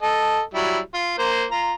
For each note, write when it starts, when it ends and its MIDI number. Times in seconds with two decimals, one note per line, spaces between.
0.02 0.41 69
0.02 0.41 75
0.54 0.79 54
0.54 0.79 55
0.54 0.79 64
0.94 1.14 65
1.18 1.45 58
1.18 1.45 72
1.51 1.73 65
1.51 1.73 82